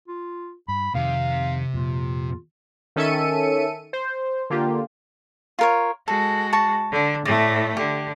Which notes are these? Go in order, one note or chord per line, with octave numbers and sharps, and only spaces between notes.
F4
G2 B5
F2 C3 D#3 F5
F2 A#2 F4
D#3 C#4 A4 E5 C#7 D#7
C5
D3 A#3 F4 G4
F4 A#4 C#5
G#3 F#4 A4
A5 C#6
D3
A2 A3 D5
D3 G4